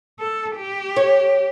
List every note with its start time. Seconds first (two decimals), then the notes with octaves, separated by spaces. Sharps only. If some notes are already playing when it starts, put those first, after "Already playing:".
0.19 A4
0.56 G4
0.96 C#5